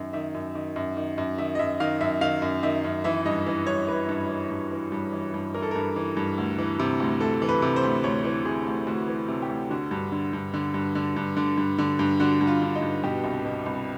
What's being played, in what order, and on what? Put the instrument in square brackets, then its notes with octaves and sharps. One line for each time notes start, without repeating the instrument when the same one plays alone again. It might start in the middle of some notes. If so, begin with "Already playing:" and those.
Already playing: [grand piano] F#2 D#3
D#3 E5
F#2
D#3
F#2
D#3
F#2
D#3 E5
D#5
F#2 E5
D#3 F5
F#2 E5
D#3 F5
F#2
D#3 E5
F#2
E3 E5
G2 D#5
E3
G2 C#5
E3 B4
G2
E3
G2
E3
G2
E3
G2
E3 A#4
A4
G2 A#4
E3
G2
D2
E3
C3
D2
D2 A4
E3
B4
C3
C5
D2
D2 C#5
E3
C3 G#4
D2
D2 F#4
E3
C3
G4
D2
D3 F#4
G2
D3
G2
D3
G2
D3
G2
D3
G2
D3
G2
D3 F#4
G2
F4
D3
D#4
G2
B2 G4
C2
B2
C2